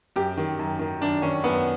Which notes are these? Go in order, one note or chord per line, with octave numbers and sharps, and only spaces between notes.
F#2 G4
D#3
F#2
D#3
F#2 D4
D#3 C#4
F#2 B3